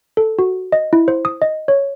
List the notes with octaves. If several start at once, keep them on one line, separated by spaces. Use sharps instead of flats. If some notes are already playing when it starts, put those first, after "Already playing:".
A4
F#4
D#5
E4
C5
D#6
D#5
C#5